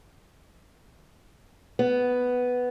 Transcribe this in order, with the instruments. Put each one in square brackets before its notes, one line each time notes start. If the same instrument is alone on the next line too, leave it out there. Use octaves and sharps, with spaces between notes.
[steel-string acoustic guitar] B3